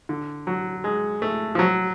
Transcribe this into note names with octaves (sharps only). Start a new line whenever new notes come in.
D3
F#3
G#3
A3
F3
F#3